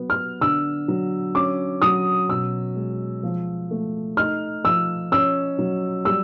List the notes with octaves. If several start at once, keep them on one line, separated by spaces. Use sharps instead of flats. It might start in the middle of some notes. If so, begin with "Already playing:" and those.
Already playing: F#3 B3
F6
D3 E6
F#3
C#4 D6
F#3 D#6
B2 E6
G#3
F3
A3
D#4 F6
F3 E6
C#4 E6
F#3
G3 E6